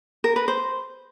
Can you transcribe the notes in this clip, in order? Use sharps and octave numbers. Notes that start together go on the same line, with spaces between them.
A#4
B4
C5